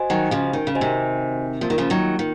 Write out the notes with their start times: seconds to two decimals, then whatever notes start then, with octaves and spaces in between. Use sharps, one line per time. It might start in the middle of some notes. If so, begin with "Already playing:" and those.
Already playing: F#4 C5 D#5 G#5
0.10 D#3 F#3
0.31 C#3 F3
0.53 D#3
0.67 C#3
0.75 F#4 C5 D#5 G#5
0.81 C3 D#3
1.61 F3 A#3 F4 A#4
1.70 D#3
1.78 C#3 F3
1.90 D#3 F#3
2.19 D#3